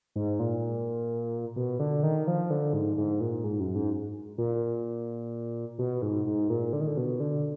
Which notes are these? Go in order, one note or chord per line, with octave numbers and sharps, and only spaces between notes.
G#2
A#2
B2
D3
D#3
F3
D3
G#2
G#2
A#2
G#2
F#2
G#2
A#2
B2
G#2
G#2
A#2
D3
D#3
D3
B2
D3